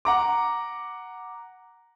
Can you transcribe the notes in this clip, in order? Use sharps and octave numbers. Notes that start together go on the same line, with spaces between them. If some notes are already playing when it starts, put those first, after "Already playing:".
F#5 A#5 D6